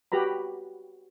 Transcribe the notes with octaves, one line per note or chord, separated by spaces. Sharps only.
F#4 G4 B4 A#5 B5